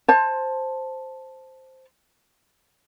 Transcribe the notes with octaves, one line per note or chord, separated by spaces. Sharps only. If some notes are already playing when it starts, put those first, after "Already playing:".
C5 A5